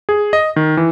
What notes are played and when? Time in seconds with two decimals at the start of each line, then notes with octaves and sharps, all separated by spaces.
0.09 G#4
0.33 D#5
0.56 D#3
0.77 E3